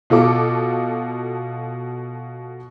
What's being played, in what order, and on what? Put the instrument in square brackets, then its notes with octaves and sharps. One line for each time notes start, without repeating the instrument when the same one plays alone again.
[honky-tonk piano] B2 F4 A4 D6